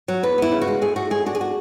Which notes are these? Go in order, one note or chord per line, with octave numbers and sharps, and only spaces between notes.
F#3
E2 B4
B3 E4
C#3
F#4
G#3
A2 G#4
A2 F#4
G#3 G#4
D4 F#4
G#4
F#4